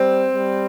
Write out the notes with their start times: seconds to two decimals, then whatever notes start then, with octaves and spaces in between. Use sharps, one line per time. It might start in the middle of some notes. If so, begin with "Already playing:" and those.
Already playing: G3 C4
0.33 G3